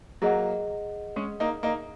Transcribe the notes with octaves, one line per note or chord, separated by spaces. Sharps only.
F#3 A#3 G#4 D#5 F#5
G#3 C#4
A#3 D#4
A#3 D#4